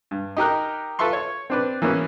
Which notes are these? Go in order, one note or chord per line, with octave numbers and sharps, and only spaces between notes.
G2
D#4 G4 A#4 F#6
F4 A4 B4 E5 C6 C#6
C#5
C4 D4 B4
E3 A#3 B3 C#4 F#4